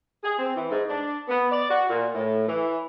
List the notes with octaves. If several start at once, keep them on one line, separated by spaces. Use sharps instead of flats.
G#4
C4
E3
G#2
D4
B3
D5
F#4
A#2
A2
E3